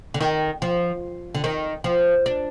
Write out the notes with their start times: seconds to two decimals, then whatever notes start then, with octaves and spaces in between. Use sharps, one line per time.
0.14 D3
0.21 D#3
0.62 F3
1.35 D3
1.44 D#3
1.84 F3
2.26 D4